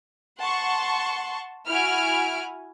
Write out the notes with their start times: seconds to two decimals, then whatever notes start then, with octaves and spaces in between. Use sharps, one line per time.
0.40 F#5 A5 C6 C#6
1.68 E4 F#4 F#5 G#5 F6 D7